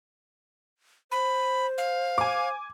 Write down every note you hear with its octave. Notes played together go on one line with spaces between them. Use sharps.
C5 B5
F5
G#5 D6